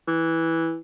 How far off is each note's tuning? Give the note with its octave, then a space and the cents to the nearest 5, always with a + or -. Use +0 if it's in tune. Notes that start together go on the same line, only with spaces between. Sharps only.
E3 -5